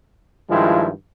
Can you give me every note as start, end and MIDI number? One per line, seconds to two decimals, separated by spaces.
0.50 0.90 43
0.50 0.90 51
0.50 0.90 53
0.50 0.90 56
0.50 0.90 64
0.50 0.90 65